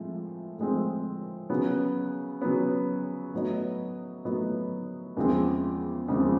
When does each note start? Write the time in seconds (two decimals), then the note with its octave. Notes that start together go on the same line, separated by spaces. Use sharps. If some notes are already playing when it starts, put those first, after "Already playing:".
Already playing: A2 F3 G#3 C4
0.58 A2 F3 G#3 C4
1.50 C#3 F#3 B3
2.41 C#3 F#3 B3
3.34 A2 F#3 B3 D#4
4.25 A2 F#3 B3 D#4
5.17 E2 C#3 F3 G#3 C4
6.08 E2 C#3 F3 G#3 C4